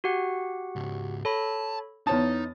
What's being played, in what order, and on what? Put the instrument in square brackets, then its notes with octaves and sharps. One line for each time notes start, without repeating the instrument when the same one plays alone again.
[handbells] F#4 G4 F#5
[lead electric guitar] C#2 G#2
[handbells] A4 C#5 B5 [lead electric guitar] A5
[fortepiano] E2 C#5 A5 [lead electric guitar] D#4 [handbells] D#6 A6